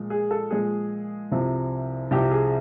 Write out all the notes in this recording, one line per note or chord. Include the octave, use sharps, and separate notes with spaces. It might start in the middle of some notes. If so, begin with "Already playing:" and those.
Already playing: A#2 F3 G#3
G#4
A4
A#2 F3 G#3 G#4
C2 C3 F3
C2 C3 F3 G4
G#4